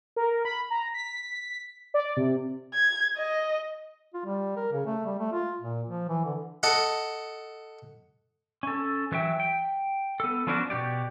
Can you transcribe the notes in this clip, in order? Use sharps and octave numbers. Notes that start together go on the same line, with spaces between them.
A#4
B5
A#5
B6
D5
C3
G#6
D#5
F4
G3
A#4
C#3
A3
G3
A3
F4
A#2
F3
E3
D3
A4 D#5 F#5
C#4 A4
E3 F#3 E5 G5
G5
B3 A4
F3 B3 C#4 D4 F4 F#4
B2 F#4 G4 D5